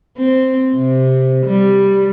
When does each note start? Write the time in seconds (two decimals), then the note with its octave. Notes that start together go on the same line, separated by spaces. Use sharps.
0.17 C4
0.75 C3
1.46 G3